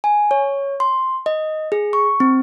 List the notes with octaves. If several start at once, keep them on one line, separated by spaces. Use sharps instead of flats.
G#5
C#5
C6
D#5
G#4
C#6
C4